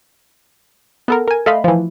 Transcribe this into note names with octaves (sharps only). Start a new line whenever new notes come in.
B3 A4 A#4
A#4 G#5
A3 D#5 F5 B5 C6
E3 F3